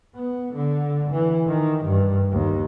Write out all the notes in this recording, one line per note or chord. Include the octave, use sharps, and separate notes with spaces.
B3
D3
E3
D#3
G2
D#2